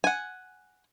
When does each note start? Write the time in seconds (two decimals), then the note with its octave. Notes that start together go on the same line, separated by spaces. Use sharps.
0.04 F#5 G#5